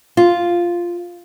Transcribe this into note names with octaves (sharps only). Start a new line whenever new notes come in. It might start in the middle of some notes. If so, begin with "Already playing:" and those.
F4